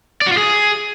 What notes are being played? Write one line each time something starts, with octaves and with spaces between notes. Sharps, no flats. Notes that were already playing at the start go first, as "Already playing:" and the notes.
D5
F#4
F4
G#4